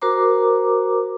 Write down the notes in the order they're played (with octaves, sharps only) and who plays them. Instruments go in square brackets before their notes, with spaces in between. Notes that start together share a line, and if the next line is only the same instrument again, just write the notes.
[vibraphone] F#4 A#4 C5 A#5 D6